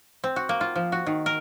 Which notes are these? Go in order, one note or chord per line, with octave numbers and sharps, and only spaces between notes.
C4
F#4
A#3
F4
F3
F#4
D#3
A#4